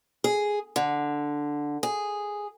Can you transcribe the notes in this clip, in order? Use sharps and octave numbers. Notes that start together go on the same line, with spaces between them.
G#4
D3
G#4